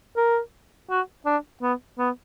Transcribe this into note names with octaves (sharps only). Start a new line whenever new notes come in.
A#4
F#4
D4
B3
B3